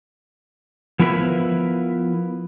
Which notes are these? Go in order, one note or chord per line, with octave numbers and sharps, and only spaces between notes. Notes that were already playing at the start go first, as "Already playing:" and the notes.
F3 B3 E4 A#4 B4